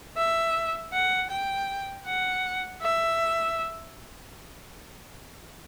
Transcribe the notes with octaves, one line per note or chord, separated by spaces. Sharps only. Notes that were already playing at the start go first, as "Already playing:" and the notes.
E5
F#5
G5
F#5
E5